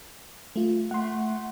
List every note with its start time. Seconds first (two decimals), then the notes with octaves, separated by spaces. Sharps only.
0.56 A3 F4
0.91 A3 F#5 C6